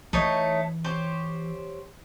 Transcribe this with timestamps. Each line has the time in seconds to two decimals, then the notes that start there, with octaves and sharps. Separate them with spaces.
0.13 E3 A3 D#4 C#5
0.84 G4 C5 C#5